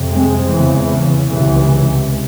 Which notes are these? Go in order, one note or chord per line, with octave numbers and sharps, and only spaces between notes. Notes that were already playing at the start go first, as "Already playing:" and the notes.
Already playing: F2 C3
G#3 C4
E2 C#3 E3
C#3
C#2 C3 E3